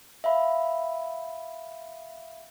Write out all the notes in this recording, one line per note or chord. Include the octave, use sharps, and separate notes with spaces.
E5 F5 B5